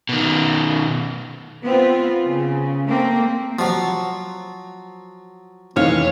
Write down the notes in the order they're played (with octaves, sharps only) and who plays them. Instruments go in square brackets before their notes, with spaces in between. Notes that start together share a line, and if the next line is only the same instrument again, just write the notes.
[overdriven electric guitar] B2 D#3
[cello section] B3 C4 F4
C#3
A3 A#3 C4
[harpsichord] F3 F#3
[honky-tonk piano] F1 D#3 E3 [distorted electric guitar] C#5 [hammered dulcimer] F5